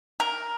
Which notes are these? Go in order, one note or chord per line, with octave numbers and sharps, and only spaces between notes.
A#4